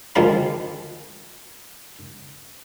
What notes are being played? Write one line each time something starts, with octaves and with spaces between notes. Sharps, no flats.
D2 D#3 F3 G#3 F5 B5